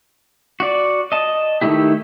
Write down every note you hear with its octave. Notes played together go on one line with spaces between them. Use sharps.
F#4 D5
D#5 A5
D#3 G3 A3 E4 G4